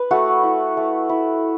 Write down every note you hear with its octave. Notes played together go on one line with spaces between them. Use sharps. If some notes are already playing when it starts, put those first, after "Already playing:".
Already playing: B4
A3 F#4
E4
A3
E4